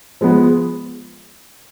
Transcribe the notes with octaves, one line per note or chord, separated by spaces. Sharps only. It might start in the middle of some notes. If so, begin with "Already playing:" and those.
F3 G#3 B3